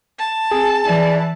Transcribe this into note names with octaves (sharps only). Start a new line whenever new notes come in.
A5
C4 G#4
E3 D5